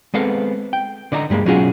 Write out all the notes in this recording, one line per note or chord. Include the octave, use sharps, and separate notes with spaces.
G#3 B3 C4 A4 F5
G5
D3 D5 D#5 A5 A#5
G2 G3 G#3 A#3
B1 F#3 C#4 F4 F#4 G#4